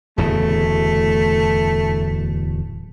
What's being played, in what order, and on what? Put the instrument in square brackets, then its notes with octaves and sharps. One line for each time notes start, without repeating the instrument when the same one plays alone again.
[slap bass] D1 E2 C#3 [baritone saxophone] A3